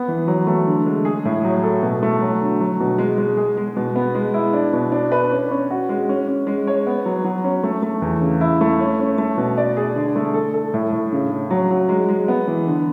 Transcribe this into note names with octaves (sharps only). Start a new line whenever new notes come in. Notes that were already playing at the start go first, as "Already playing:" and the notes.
Already playing: B3
E3
F#3
A3
D3
G#3
G#4
A2
F#3
A4
B2
A3
F#3
D3
F#3
B2
G#3
G#3
G#4
G#3
B2
B3
G#3
E4
D4
B2
D4
B4
C#4
C#4
F#4
G#3
C#4
C#4
G#3
C#5
B3
F#3
F#3
C#4
A3
A3
E2
C#3
E4
A3
C#4
C#4
A3
B2
D5
G#4
D3
A3
A4
A4
A2
A2
C#3
C#3
F#3
F#3
G#3
G#3
B3
E3
D3